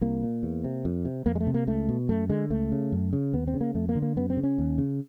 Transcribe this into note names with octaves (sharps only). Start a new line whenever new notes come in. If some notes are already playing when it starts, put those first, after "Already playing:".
C2 A#3
A#2
E2
C3
F2
C3
F2 A#3
G#3
A3
C3
A#3
C#2 A3
B2
F#2 A3
D3 G#3
C#2 A3
C#3
F#2
C#3
D#2 B3
C4
C#3
A#3
F2 A3
A#3
D3
A#3
F#2 B3
C4
C#3
C#4
D#2
C#3